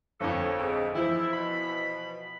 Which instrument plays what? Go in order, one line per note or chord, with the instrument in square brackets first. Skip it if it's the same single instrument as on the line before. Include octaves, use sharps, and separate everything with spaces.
[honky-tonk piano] G1 F2 [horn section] A4 C#5
[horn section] G#2
[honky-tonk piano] E3 F3 [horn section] E4
[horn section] B2 B5